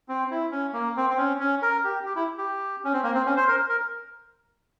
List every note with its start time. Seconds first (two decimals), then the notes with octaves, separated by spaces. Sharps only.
0.09 C4
0.31 E4
0.51 C#4
0.73 A#3
0.96 C4
1.10 C4
1.17 C#4
1.40 C#4
1.62 A#4
1.84 G4
2.06 G4
2.16 E4
2.38 G4
2.84 C#4
2.93 C4
3.04 A#3
3.14 C4
3.26 C#4
3.37 C5
3.48 A#4
3.69 A#4